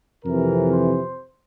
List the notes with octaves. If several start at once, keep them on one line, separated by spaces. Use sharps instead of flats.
F2 C3 E3 A#4
C5